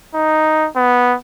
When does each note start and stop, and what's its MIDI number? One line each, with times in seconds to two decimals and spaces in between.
0.15 0.68 63
0.76 1.15 59